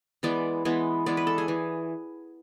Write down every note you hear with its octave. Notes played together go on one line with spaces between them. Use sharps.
E3 G#3 B3 D5
E3 G#3 B3
E3 G#3 B3 D5
B4
A4
G#4
E3